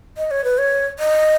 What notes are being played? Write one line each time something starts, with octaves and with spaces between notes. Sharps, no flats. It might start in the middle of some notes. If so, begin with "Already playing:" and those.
D#5
C#5
B4
C#5
D#5